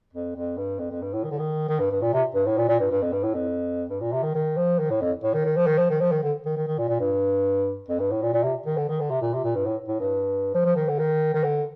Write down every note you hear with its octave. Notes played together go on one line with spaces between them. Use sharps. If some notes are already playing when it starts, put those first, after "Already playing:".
F2
F2
G2
F2
F2
G2
A2
D#3
D3
D#3
D#3
G2
G2
A#2
C3
G2
A2
A#2
A#2
G2
G2
F2
G2
A2
F2
G2
A#2
C3
D#3
D#3
F3
D#3
A2
F2
A2
D#3
D#3
F3
D#3
F3
D#3
F3
D#3
D3
D#3
D#3
D#3
A#2
A#2
G2
F2
G2
A2
A#2
A#2
C3
D#3
D3
D#3
D3
C3
A#2
C3
A#2
G2
A2
A2
G2
F3
F3
D#3
D3
D#3
D#3
D3